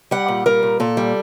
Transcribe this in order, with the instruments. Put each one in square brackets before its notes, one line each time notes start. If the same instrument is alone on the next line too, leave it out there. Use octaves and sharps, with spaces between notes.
[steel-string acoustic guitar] G3 F#5
A#2
G3 A#4
A#2
A#2 A4
G3